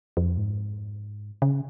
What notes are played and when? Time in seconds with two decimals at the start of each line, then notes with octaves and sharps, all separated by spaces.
0.17 F2
0.38 G#2
1.42 C#3